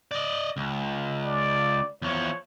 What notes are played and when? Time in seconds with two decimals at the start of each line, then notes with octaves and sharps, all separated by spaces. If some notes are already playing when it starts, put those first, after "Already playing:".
0.11 D5 D#5
0.57 C#2
1.25 D5
2.02 E2 F3 C#5